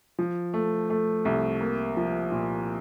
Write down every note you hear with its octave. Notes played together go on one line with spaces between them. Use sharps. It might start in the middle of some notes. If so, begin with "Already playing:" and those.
F3
A3
A3
C2
A#3
F3
A#2